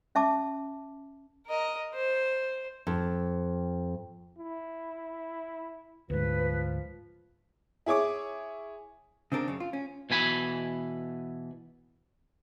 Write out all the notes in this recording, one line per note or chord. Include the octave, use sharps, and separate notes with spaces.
C#4 E5 A5 D6
A#4 D#5
C5
F2
E4
D2 G#2 F3 B4
E4 G#4 C#5 D6
C#3 C4 D4 A#4
F#2 C#3
F4
C#4
B2 E3 G#5 B5